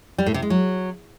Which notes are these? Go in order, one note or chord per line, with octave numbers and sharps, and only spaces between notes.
G3
A2
C3
G#3
F#3